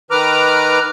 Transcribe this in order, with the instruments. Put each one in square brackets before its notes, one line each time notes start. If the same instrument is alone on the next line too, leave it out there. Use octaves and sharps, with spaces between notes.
[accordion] D#3 B4 A#5 D6 F6